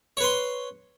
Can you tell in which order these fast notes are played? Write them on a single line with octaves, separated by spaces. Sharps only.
C#5 B4 C6